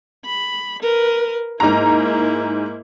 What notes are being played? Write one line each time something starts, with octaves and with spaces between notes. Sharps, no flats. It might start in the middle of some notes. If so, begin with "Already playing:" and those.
B5
A#4 B4
G#2 A#3 E4 A#5